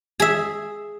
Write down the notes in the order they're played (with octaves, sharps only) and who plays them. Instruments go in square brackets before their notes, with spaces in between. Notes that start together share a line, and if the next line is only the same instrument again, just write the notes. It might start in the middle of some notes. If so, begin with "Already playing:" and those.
[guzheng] G#4 E5